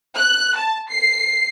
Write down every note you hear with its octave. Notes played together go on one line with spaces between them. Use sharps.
F#6
A5
C7